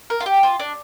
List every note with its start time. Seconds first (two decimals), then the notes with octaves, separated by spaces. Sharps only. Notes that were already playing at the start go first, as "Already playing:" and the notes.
0.10 A#4
0.20 F4
0.26 G4
0.43 F4
0.59 D4